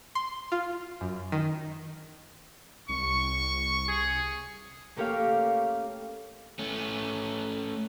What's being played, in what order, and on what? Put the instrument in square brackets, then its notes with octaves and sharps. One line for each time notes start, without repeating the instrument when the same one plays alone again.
[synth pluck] C6
F4
F#2
D#3
[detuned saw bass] C2 [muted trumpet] C#6
[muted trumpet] G#4
[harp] A3 A#3 C#4 G4 C#5 F5
[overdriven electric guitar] A3 C#4